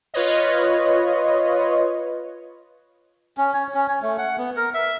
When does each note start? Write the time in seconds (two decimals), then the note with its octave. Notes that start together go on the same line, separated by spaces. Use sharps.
0.14 F4 B4 C#5 D#5
3.37 C#4
3.53 C#5
3.74 C#4
3.88 C#5
4.02 A3
4.18 F#5
4.38 B3
4.57 A#4
4.74 E5